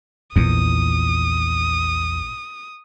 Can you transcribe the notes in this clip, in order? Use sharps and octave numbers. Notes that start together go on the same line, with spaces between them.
A#1 E2 F4 D#6